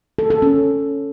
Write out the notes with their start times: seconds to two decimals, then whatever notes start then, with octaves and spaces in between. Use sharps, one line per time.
0.19 A4
0.30 A4
0.42 C#4